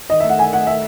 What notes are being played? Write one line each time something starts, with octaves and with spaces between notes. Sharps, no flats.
D#3 D#5
E5
A3
F#5
D#3 G#5
A3 F#5
A3 E5